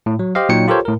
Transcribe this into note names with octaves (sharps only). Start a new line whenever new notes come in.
A2
F#3
G4 C5 D#5 F5
A#2 F#3 D#4 C#5 G5 C#7
F4 G4 A4 A#4 C5 C#5
A2 A#4